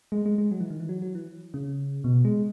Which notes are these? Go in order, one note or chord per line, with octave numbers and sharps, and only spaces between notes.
G#3
G#3
G#3
F#3
E3
D#3
E3
F#3
F#3
E3
C#3
B2
G#3